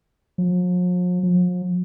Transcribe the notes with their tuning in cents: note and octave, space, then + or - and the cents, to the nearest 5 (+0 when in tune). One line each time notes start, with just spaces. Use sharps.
F3 +45
F3 +40